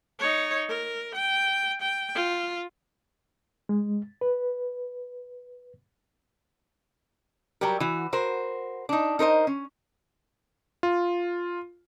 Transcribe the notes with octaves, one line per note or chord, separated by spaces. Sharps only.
D#4 C#5
A#4
G5
G5
F4
G#3
B4
F#3 G3 G4 A#4
E3 F#4
F#4 A#4 C5
D4 D#4
D#4 A#4 C5 D#5
C#4
F4